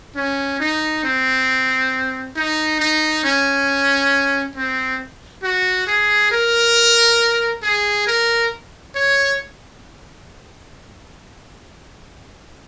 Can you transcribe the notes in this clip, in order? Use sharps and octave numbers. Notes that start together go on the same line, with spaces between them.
C#4
D#4
C4
D#4
D#4
C#4
C4
F#4
G#4
A#4
G#4
A#4
C#5